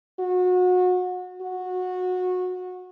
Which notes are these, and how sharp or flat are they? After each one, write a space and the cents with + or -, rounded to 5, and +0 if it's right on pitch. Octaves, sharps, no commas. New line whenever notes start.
F#4 -30
F#4 -20